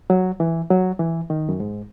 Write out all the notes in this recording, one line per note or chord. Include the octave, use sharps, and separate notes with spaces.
F#3
E3
F#3
E3
D#3
F#2
G#2